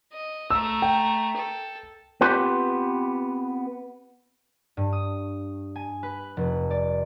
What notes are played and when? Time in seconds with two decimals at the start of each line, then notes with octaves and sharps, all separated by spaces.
0.12 D#5
0.50 A3 A#5 E6
0.82 G5
1.36 A4
2.21 B3 C4 F4 G4 B4
4.77 G2
4.93 D#6
5.76 G#5
6.03 B4
6.37 F1
6.71 D5